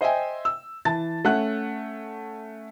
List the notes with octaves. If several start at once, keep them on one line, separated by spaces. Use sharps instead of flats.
C5 D#5 E5 G5 G#5
E6
E3 A5 A6
A3 C#4 F#5 F#6